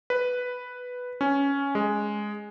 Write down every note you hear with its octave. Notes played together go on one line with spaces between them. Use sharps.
B4
C#4
G#3